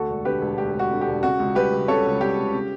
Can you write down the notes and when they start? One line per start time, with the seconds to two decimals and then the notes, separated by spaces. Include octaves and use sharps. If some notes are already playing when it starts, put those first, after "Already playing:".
Already playing: D2 F#4 A4
0.09 E1
0.25 D3 G4 B4
0.42 E1
0.58 D2 G4
0.74 E1
0.79 F#4
0.91 D3
1.01 G4
1.07 E1
1.23 C#3 F#4
1.39 C#2
1.55 G3 G4 B4
1.72 C#2
1.88 C#3 A4 C#5
2.05 C#2
2.21 G3 G4
2.37 C#2
2.54 C#3